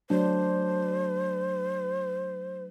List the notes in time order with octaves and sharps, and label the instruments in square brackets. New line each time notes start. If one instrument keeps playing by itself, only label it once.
[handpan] F#3 A3 D4 [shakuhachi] C5